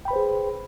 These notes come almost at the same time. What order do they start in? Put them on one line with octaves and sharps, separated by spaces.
G5 B5 B4 C5 G#4